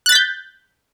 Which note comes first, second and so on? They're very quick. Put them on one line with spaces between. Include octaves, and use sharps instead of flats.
F#6 A6 B6 G6